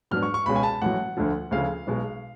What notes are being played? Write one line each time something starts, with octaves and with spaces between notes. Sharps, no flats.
G#2 F#3 B3 D4 F6
C#6
C#6
C#2 B2 G#3 C#4 B5
G#5
A5
A1 A2 F#3 F#5
D2 D3 F3
D2 C#3 F3 F5
B1 B2 G#3